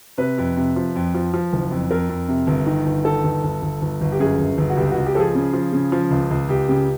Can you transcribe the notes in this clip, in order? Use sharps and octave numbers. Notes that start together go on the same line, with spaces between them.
C3 B4
F2
C3
F3
F2
F3
F3
F#1
F2
F2 A#4
F2
C3
G1
D#3
G1
D#3 A4
G1
G1
G1
G1
G1
G4
F#2 G#4
G1
G1
F#4
C#2 G4
C#2 F#4
G4
F3 G#4 A4
C#3
F3
C#3
F3
C#2
C#2
C#2 G4
C#3 G4